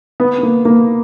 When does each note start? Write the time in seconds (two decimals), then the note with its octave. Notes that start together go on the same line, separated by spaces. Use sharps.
0.20 B3
0.38 B3
0.43 A#3
0.65 A#3